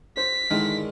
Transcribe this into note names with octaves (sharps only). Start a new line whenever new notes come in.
C5 B6
G#2 D3 D#3 G#3 D#4 E4